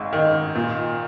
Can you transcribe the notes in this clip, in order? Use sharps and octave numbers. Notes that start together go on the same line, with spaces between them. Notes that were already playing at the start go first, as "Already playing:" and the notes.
Already playing: G#1 G#2
D#3
A#2